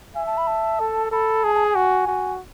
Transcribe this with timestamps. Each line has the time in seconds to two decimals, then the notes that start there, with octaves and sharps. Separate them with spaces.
0.15 E5 G#5
0.27 A5
0.38 B5
0.47 A5
0.80 A4
1.11 A4 B5
1.44 G#4 A5
1.55 A5
1.65 G#5
1.75 F#4
2.08 F#4